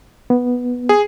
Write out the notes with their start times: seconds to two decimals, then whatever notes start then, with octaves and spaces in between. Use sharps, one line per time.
0.30 B3
0.89 G#4